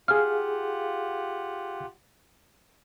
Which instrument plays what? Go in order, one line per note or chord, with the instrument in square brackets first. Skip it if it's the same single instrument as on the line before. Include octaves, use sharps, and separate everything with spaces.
[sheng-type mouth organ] F4 G4 F#5 [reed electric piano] G#4 F5 [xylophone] F6